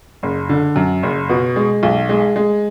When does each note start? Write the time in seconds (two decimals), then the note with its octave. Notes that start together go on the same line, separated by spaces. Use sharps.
0.23 F#1
0.49 D3
0.76 F#2
1.03 F#1
1.29 B2
1.56 G#3
1.83 B1
2.09 G#3
2.36 G#3